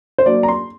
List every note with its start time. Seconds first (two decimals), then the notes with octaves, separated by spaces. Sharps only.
0.18 C5
0.26 F#3 A#3 D4 D5
0.43 A#5
0.48 C6